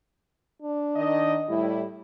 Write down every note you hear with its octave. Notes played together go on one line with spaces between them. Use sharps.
D4
D#3 D#5
A2 G3 E4